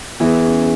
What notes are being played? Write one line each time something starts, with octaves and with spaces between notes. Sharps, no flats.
E2 E3 G#4
C#4